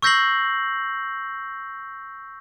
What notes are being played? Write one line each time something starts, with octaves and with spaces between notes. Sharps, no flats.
C#6 E6 G6 A#6 C7 F#7